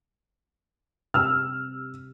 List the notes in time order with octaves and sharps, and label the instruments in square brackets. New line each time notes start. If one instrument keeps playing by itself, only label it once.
[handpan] C3 G3 [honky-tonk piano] E6 F6